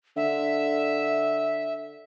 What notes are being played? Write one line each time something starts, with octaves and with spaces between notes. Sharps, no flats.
D3 E5